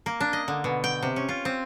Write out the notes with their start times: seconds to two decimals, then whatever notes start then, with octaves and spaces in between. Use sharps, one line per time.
0.06 A#3
0.20 D4
0.33 D#5
0.48 D3
0.64 B2
0.84 G5
1.03 C3
1.16 C#4
1.29 F4
1.45 C4